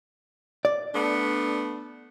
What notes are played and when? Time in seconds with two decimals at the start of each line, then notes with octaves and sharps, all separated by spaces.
0.65 D5
0.94 A3 B3 D4